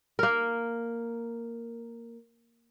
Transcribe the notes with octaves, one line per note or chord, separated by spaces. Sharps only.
A#3 A#4